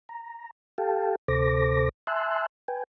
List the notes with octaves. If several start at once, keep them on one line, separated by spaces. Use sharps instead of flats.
A#5
G4 A4 F5 G5 A5
D2 C3 A4 C5 D6 A#6
E5 G#5 A5 C6 E6 F#6
B4 G5 G#5